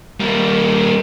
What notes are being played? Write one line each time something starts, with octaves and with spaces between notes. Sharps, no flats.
G3 A#3